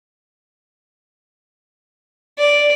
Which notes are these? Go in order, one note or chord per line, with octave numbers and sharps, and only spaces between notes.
D5